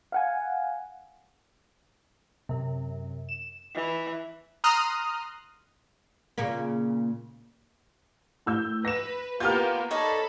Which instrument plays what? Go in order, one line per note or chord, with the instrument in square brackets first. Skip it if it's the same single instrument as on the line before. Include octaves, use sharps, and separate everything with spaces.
[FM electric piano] F5 F#5 G#5
[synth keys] F#2 C3
E7
[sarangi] E3
[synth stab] A#5 C6 D#6 F6 F#6
[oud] A#2 C#3 A#3
[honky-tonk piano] A2 E6 G6
[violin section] B4 [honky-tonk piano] A#6 E7
[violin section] A#3 B3 [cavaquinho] F4 G4 [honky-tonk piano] F6 G6
[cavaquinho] D#4 C#5 D5 [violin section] A4 B5